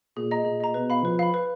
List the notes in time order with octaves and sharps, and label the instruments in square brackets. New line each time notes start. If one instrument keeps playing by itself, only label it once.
[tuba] A#2 [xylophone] G#4
[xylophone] D#5 A#5
[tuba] A#2 [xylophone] G#4
[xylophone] D#5 A#5
[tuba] B2 [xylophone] B4
[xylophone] F5 B5
[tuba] F3 [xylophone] B4
[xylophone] F5 B5
B4